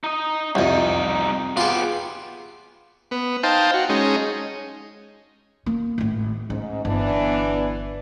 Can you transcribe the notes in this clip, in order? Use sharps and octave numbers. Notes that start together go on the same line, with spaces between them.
D#4 D#5
C2 F2 C3 D#4
B3 F4 G4 G#4
B3
D#4 C5 F5 G5 A5
F#4
G#3 C#4 D#4
A#3
G#1 A2
G#2 C#4
G1 E3 B3 D4